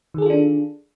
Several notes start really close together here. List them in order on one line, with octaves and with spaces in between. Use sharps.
D#3 G#4 A4 F4 D4